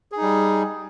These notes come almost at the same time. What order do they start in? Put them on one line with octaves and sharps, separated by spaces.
G#4 D#4 G3